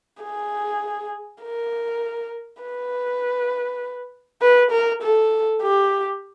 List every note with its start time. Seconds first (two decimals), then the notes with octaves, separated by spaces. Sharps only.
0.23 G#4
1.43 A#4
2.62 B4
4.42 B4
4.71 A#4
5.02 A4
5.62 G4